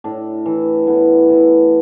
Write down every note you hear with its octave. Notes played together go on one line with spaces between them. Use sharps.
A2 D4
E3
A2 B3
E3 E4